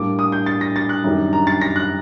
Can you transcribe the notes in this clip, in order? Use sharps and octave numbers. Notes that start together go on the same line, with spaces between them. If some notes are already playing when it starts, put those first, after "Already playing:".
Already playing: A2 G3 A#3 D4 D6
D#6
G6
A6
A#6
A6
F#6
F#2 D#3 G3 D4
A#5
A6
A#6
F#6